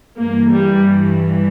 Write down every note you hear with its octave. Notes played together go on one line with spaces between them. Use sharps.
G2 E3 A#3
G3